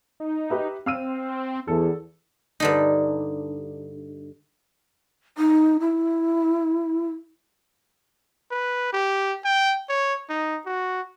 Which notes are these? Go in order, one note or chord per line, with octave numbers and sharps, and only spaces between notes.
D#4
G4 B4 E5
C4 F5 E6 D#7
E2 A4
G2 D3 D#4
D#4
E4
B4
G4
G5
C#5
D#4
F#4